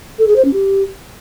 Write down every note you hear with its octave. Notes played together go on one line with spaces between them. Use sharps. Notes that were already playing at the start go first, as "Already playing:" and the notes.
A4
G#4
C5
C#4
G4